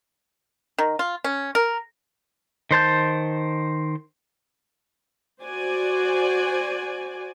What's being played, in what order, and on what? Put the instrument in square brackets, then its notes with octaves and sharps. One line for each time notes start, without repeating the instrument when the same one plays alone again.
[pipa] D#3
F4
C#4
A#4
[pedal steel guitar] D#3 C5 A5 G6
[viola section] F#4 C5 D5 G#5